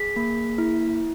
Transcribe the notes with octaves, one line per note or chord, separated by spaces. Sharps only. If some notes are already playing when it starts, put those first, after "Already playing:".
Already playing: G#4 B6
A#3
E4